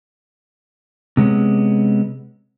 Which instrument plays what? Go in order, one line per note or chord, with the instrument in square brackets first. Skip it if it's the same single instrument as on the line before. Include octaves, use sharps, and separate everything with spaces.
[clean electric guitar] C3 G#3 B3 C#4